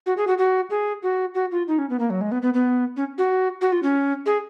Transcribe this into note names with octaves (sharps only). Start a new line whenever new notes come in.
F#4
G#4
F#4
F#4
G#4
F#4
F#4
F4
D#4
C#4
B3
A#3
F#3
G#3
B3
B3
B3
C#4
F#4
F#4
F4
C#4
G#4